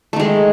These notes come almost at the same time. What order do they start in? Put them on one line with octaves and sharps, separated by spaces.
A3 D#3 G#3